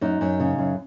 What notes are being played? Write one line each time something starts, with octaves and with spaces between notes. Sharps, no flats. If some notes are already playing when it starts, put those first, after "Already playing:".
F#2 D#4
F#2
C#3
F#2